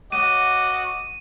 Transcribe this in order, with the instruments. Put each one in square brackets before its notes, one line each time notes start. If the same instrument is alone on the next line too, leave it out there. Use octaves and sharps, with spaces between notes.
[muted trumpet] F#4 [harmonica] D#5 D6 [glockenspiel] D#7